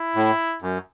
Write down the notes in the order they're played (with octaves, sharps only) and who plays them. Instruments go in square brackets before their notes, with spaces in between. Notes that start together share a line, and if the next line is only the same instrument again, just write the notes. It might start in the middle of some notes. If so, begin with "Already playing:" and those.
Already playing: [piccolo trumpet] E4
[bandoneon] A2
F#2